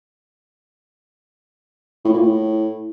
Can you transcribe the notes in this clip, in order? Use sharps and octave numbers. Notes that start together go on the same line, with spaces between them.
A2
A#2
A2